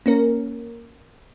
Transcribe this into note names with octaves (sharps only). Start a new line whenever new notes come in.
A#3 C#4 A#4